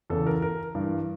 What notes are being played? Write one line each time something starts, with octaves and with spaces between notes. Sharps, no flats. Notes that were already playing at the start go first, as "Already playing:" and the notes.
E2 C#3 E3 A4
A#4
A#4
G2 E3